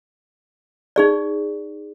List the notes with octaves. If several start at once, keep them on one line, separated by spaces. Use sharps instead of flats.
D#4 G#4 D5